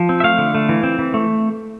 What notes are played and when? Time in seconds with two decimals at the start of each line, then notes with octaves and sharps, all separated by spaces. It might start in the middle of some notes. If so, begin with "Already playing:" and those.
Already playing: F3
0.09 C4
0.20 E5
0.23 A3 F5
0.38 D3
0.55 A3
0.69 E3
0.83 C4
0.99 E3
1.14 A3